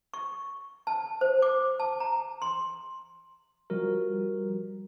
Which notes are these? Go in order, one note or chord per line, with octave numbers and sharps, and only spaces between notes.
C#6
A5
C5
D6
A5
A#5
C6
F3 G3 F#4 A#4